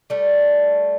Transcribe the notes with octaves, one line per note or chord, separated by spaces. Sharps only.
G3 A3